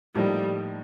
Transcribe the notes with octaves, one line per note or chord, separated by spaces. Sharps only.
A2 F3 G3 A#3 D#4